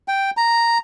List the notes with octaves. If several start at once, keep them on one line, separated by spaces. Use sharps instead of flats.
G5
A#5